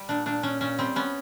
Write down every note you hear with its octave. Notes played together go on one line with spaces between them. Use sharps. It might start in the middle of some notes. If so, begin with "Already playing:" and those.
Already playing: G3
A#2 D4
A#2 D4
A#2 C#4
A#2 C#4
G3 C4
B3 C#4